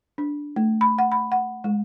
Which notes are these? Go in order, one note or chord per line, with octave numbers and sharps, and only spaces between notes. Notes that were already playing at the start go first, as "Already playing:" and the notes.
D4
A3
B5
F#5
B5
F#5
G#3